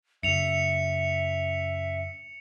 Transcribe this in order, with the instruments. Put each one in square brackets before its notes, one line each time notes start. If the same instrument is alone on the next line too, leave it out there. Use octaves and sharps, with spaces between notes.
[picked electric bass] F#2 C#3 [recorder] E5 [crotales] C#7 F7